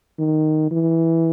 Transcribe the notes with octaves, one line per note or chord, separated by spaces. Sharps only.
D#3
E3